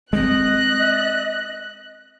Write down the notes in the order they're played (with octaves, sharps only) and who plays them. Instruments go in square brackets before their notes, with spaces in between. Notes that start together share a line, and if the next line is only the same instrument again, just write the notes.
[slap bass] G#3 A#3 C4 [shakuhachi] D#5 [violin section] F#6